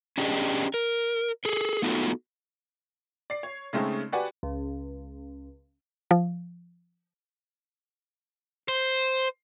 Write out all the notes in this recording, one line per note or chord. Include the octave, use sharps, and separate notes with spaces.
C#4 D4 G4 G#4 D#5
A#4
G#4 A4
A3 B3 D#4 F4 F#4 A4
D5 C7
C#5
C#3 G#3 A3 C4 C#4 D#4
F#4 G4 B4 D5 F#5 G#5
C#2
F3
C5